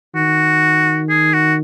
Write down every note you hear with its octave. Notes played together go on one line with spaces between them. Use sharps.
D#3 F#4
G#4
F#4